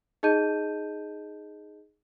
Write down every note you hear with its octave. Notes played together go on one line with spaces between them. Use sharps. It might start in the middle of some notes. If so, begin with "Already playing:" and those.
D#4 G#4 D#5 A5 G6 D#7